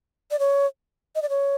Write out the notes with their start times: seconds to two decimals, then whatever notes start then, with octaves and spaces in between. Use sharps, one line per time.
0.31 D5
0.39 C#5
1.15 D#5
1.22 D5
1.29 C#5